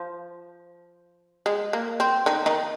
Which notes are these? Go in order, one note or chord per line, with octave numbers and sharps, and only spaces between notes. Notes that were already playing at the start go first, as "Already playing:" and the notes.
Already playing: F3
G#3
A#3
C4
D#3 D#4
D#3 D#4